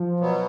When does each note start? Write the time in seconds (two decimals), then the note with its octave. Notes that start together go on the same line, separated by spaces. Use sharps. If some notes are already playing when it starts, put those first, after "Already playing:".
Already playing: F3
0.20 B2 F#3 B3